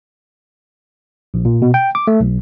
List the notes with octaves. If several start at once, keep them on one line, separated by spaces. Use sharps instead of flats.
A#1
A#2
B2
G5
D6
A3
B1